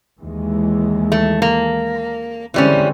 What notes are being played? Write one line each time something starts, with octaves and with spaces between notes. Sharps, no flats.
D#2 E3 G#3
A3
A#3
D3 E3 G3 G#3 C4 C#4